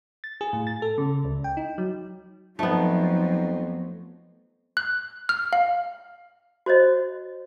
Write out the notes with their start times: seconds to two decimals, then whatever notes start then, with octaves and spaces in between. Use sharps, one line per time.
0.24 A6
0.41 G#4
0.53 A2
0.67 A6
0.82 A4
0.98 C#3
1.25 C#2
1.44 G5
1.57 D#4
1.78 F#3
2.59 F2 F3 F#3 A3 B3 D#4
4.77 F#6
5.29 F6
5.53 F5
6.66 F#4 C5 C#5 D#5